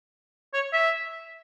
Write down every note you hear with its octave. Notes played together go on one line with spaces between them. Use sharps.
C#5
E5